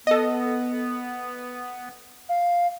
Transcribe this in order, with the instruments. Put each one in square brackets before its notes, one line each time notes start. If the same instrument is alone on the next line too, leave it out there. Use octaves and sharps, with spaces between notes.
[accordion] B3 [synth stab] A4 D#5
[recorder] F5